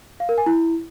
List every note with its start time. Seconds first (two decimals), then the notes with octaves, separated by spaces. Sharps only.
0.20 F5
0.29 A#4
0.38 G#5
0.46 E4